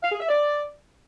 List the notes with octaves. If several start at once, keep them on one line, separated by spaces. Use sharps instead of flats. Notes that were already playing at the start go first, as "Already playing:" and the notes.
F5
G#4
E5
D5